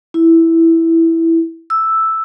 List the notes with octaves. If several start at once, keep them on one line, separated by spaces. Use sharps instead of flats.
E4
E6